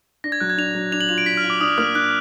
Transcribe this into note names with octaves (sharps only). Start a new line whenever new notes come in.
D4 A#6
G#6
F#3 F#6
G#6
D4 F7
F#3
D4 F7
F#7
F4 F7
D7
D4 B6
F6
F4
D6
D4 D#6
A#3 F6
D4 F#6